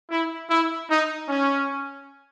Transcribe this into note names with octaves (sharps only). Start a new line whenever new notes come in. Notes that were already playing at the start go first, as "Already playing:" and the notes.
E4
E4
D#4
C#4